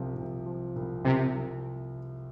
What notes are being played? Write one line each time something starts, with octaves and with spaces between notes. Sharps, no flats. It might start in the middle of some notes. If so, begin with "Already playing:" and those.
Already playing: C2 C3 F3
C2
F3
C2
C2 C3
C2